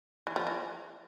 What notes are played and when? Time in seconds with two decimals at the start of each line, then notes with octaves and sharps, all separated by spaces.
0.27 E3
0.36 F3
0.47 E3